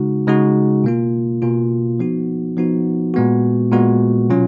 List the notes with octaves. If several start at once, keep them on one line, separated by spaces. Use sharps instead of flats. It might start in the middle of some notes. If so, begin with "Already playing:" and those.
Already playing: C#3 G#3 D#4 F#4
C#3 G#3 D#4 F#4
B2 A#3 F4
B2 A#3 F4
F3 B3 D#4 F#4
F3 B3 D#4 F#4
A#2 G#3 B3 F#4
A#2 G#3 B3 F#4
B2 F#3 C#4 F4